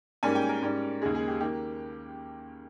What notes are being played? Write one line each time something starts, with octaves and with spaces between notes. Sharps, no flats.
G#2 G3 A#3 C#4 G#5
G5
A#4
G#2 G3 C#4
D#2 C#3 G#3 G#4
G#4
G4
D#3 A#3 G4